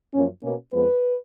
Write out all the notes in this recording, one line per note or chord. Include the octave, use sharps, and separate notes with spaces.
F#2 F3 A#3 C#4
B2 A#3 C#4
F2 F3 G#3 B3 B4